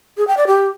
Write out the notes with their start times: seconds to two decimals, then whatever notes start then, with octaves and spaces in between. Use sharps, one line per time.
0.18 G#4
0.27 G5
0.37 D5
0.47 G4